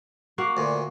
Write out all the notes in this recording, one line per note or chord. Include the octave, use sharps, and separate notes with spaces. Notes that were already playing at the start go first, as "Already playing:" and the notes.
A#3 F#4 F5
D2 A#2